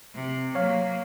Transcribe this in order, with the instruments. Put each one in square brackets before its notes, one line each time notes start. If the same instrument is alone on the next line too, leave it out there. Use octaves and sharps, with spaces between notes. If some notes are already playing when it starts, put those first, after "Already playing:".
[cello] C3
[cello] F#3 A#3 [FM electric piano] C#5 F5